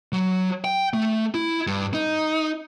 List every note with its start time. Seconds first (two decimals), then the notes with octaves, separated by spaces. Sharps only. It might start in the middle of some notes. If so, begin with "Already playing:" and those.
0.13 F#3
0.65 G5
0.94 A3
1.34 E4
1.67 G2
1.94 D#4